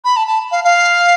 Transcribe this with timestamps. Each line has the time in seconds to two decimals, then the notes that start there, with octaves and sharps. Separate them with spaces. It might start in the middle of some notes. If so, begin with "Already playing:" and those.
0.05 B5
0.17 A5
0.28 A5
0.51 F5
0.64 F5